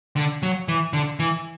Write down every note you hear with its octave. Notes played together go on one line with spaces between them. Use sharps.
D3
F#3
E3
D3
E3